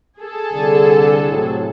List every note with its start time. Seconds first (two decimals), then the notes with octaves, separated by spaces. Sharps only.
0.19 G#4 A4
0.53 C2 D3
1.30 A2 C3 F#3